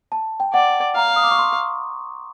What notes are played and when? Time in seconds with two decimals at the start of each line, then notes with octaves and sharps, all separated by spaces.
0.12 A5
0.40 G5
0.53 D5 F#5
0.96 F5 A#5
1.16 D#6
1.23 D6
1.31 C#6
1.38 C6